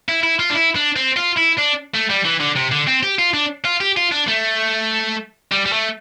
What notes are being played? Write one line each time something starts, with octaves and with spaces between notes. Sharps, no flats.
E4
E4
F4
D4
E4
D4
C4
F4
E4
D4
A3
G3
E3
D3
C3
D3
C4
G4
F4
D4
F4
G4
F4
D4
A3
G3
G3
A3